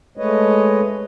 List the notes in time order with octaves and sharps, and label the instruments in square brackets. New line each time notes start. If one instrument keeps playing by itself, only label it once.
[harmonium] G#3 A3 B4 C#5 D#5